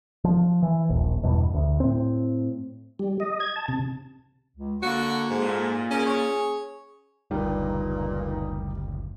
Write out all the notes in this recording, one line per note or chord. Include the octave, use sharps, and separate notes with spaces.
F3
E3
D#1 A#1
E2 G2 B2
D2
A2 C4
G3
D#5
G#6
A5
C3
C#2
D3 A#3 F#4 A4 C#6
G#2 A4
A#2
C#4 G#4 A#4
C#5
F#1 D2 G2 A#2 G3 D#4